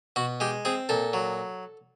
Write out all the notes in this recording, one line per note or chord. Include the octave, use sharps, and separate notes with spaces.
B2 F#4
G#3 G4
C4 G#4
A#2 A4
F#3